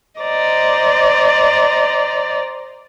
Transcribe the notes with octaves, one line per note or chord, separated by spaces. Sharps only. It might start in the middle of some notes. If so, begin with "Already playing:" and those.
C5 D5 D#5 A#5